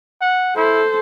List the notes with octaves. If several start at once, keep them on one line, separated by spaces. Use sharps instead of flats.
F#5
E4 A4 C5